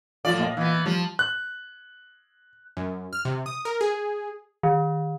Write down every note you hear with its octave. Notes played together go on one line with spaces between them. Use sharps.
A2 F3 F4 D5 F5
A#2 D#5 F5
E3 B3
F3 G3
F#6
F#2
F6
C3
D#6
A#4
G#4
D#3